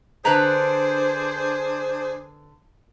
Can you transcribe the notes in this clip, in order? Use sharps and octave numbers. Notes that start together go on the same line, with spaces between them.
D3 D4 G#4 B4 C5 A#5